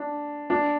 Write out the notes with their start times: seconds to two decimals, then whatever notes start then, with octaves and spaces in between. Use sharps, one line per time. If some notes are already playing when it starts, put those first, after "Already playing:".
Already playing: D4
0.50 D4